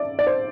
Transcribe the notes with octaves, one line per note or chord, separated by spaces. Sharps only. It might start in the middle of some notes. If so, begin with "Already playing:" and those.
Already playing: D5 E5
D5
C5